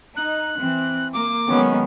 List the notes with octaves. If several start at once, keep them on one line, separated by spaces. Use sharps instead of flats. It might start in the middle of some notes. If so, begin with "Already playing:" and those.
D#4 F#6
E3 C4
A#3 D6
D#3 F#3 G#3 B3 C#4